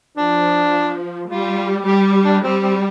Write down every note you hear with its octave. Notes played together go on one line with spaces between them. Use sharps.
F3 D4
G3 F4
G3 G4
D4
G3 C4
C4